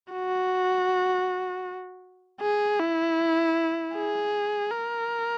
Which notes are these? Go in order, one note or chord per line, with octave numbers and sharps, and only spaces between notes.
F#4
G#4
E4
G#4
A#4